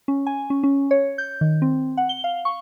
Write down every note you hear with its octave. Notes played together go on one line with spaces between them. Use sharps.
C#4
G#5
C#4
C#4
C#5
G6
D#3
C4
F#5
G7
F5
C#6